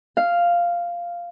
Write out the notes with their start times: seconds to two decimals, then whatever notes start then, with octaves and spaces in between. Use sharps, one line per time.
0.17 F5